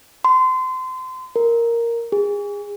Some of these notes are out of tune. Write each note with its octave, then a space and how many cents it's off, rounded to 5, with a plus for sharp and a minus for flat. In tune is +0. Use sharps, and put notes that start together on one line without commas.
C6 -30
A#4 +0
G#4 -30